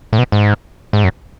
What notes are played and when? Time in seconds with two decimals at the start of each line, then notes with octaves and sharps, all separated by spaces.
0.13 A2
0.19 B2
0.32 G#2
0.93 G#2
1.04 F#2